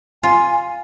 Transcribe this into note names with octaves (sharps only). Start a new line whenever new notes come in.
F4 G#5